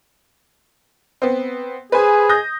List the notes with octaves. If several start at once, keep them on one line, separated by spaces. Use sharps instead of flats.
B3 C4
G#4 B4 C5 G#5
D#6 G6 A#6